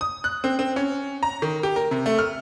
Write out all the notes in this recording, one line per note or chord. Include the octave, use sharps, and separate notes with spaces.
D#6
F#6
C4
C4
C#4
A#5
D#3
G4
A#4
C3
A3
F6